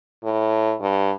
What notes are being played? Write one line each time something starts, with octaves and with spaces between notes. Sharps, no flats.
A2
G2